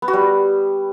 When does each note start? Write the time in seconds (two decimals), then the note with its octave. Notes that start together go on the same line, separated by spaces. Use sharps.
0.02 B3
0.08 F#4
0.13 G3